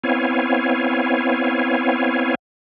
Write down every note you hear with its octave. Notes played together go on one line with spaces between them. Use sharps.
B3 C4 E4 C#5 F5 G#5